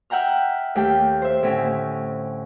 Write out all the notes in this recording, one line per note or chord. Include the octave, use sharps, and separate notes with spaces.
E5 F#5 G5 A#5 F6
D#2 A3 G4 G5
C5 E5
A2 D3 C4 C#4